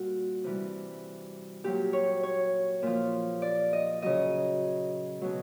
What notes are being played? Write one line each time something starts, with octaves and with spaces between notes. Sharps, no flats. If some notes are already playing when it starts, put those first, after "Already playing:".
Already playing: A#2 G3 F#4
C3 E3 G3
A#2 F#3 G4
C#5
C#5
A#2 F3
D5
D#5
C#3 F#3 D#5
B2 F#3